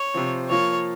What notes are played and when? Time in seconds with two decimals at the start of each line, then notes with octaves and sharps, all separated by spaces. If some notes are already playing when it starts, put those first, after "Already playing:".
Already playing: C#5
0.14 C3 F3 C4
0.50 F3 A#3 F4 C#5